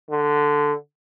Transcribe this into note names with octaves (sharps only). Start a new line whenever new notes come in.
D3